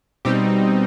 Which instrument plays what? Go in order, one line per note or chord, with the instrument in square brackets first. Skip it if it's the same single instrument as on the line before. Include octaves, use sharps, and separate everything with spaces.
[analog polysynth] B2 G3 C4 D#4 G4